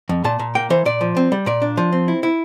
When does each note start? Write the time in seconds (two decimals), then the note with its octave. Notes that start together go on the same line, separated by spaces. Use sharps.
0.09 F2
0.24 A#2 A5
0.39 A#2
0.55 A#3 G5
0.70 E3 C5
0.85 A#2 D5
1.01 F3
1.17 C4
1.32 G3
1.46 A#2 D5
1.62 D4
1.77 F3
1.92 C4
2.08 E4
2.23 E4